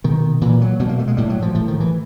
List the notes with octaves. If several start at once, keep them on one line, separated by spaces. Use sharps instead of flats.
B2 D#3
A#2 E3
F#3
B2 G3
A#3
A3
G#3
A2 G3
F#3
F3
A2 F3
D#3
E3